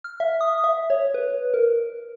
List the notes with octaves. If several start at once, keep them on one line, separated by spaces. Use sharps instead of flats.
F6
E5
D#6
E5
C#5
B4
A#4